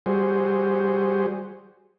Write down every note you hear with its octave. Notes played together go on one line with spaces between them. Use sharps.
G3 F#4 G#4 C5